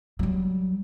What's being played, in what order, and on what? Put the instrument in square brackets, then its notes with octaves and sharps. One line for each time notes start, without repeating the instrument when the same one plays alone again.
[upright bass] F#3 G3